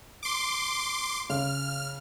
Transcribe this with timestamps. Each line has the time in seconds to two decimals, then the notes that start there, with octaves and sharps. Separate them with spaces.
0.23 C6 D6
1.30 C#3 F6